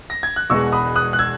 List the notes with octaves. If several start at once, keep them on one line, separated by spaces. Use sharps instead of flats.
A#6
G#6
F#6
E1 E2 B2 G#3 C#6 E6
B5 D#6
D#6 F#6
F#6
E6 G#6